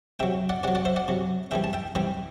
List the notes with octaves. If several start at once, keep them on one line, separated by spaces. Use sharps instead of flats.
C3 F#3 E5 G5
D5 F#5
C3 F#3 D5 F#5
D5 F#5
C5 E5
D5 F#5
C3 F#3
C3 E3 G3 E5 G5
A5
E5 G5
C3 E3 G3 E5 G5